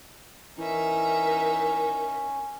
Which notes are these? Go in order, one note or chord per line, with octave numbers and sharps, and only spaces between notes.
E3 C#4 D#4 A#4 E5